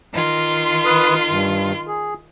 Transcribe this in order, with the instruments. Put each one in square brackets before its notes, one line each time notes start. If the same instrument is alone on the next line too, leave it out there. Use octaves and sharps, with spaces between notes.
[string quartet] D#3 F4 C6
[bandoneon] B4 D#6
G2
G#4